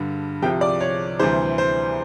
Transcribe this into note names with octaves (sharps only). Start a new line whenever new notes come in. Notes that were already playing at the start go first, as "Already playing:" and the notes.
Already playing: G2 D3 G3
C2 C3 F3 G5
D5
C#5
D2 C3 E3 G3 C5
C5